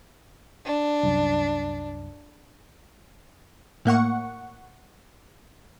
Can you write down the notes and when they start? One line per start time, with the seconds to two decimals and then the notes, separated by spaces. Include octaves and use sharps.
0.66 D4
1.03 C2 F#2
3.85 A2 A#3 F#5 C#6